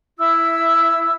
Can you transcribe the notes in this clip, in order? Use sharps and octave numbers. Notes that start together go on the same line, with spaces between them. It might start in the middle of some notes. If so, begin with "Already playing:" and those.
E4 E6